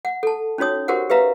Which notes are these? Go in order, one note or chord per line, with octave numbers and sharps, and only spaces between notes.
F#5
A4 A5
C#4 D#4 F#4 C#5 D#6
F#4 G4 A#4 C5 F#5
G4 B4 E5 F5 A#5